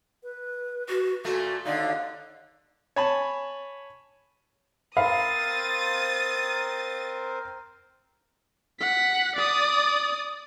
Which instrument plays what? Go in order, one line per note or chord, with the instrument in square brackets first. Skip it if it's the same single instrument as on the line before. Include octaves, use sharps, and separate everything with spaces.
[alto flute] B4
[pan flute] F#4
[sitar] A#2 A3 [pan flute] F#4
[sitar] D#2 D3 D#4 [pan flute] D5 [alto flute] F5
[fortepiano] C#5 G#5 A5 B5
[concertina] C4 A#4 C5 [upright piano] F5 B5 [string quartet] D#6 A6
[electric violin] F#5 B6
D5 D#6